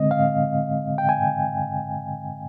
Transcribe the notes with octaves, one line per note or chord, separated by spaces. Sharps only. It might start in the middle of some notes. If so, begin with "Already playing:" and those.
Already playing: D3 G#3 C4 D#5
F5
G5
G#5